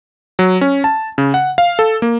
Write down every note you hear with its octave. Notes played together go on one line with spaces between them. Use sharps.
F#3
C#4
A5
C#3
F#5
F5
A4
A#3